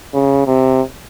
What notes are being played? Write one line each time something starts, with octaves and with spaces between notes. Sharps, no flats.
C#3
C3